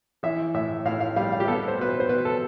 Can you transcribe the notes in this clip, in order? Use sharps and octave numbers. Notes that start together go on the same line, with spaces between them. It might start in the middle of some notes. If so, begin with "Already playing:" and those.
E3 E5
A2 E5
A2 F5
F5
G3 F5
F5
G4
B3 A4
C5
B2 B4
C5
C5
B2 B4
A4